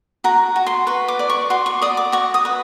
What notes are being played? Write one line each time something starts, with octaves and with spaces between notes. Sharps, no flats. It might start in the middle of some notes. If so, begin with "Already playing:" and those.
F#4 A#5
F#4
C6
B4 C#6
D6
D5
C#6
F#4 C6
C#6
D5 D#6
D6
F#4 C#6
D#6
B4